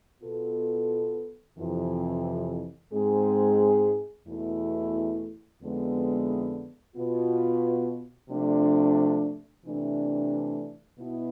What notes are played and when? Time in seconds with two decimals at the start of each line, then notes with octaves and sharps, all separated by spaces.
0.23 B2 B3 F4 A4
1.58 F2 C3 E3
2.92 G#2 G#3 C4 G#4
4.27 E2 B2 A3 E4
5.61 F2 D3 G#3 B3 E4
6.95 B2 B3 F4
8.30 C3 F3 A3 D4
9.64 C3 E3 A3 D4
10.99 B2 B3 E4